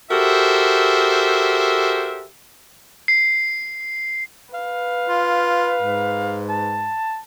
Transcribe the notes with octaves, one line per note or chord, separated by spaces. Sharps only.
F#4 G4 A4 A#4 C5 E5
C7
B4 F5
F4
G#2
A5